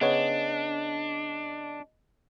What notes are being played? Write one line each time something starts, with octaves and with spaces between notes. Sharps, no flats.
C#3 B3 D4 C#5 D#5